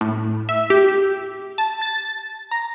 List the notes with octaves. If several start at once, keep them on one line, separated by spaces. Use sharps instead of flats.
A2
E5
G4
A5
A6
A#5